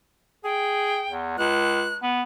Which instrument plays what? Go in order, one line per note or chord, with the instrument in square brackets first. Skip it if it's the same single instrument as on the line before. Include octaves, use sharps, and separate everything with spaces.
[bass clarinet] G#4 [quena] G5
[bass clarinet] E2
[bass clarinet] C#2 [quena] F#6
[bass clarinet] B3